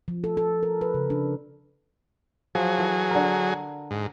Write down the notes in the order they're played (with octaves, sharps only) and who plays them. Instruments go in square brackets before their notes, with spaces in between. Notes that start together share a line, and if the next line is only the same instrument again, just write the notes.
[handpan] F3
A4
A4
A#4
B4
C#3
D4
[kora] F3 [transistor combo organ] F#3 G#4
[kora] E3 A4
D3 A#4
[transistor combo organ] G#2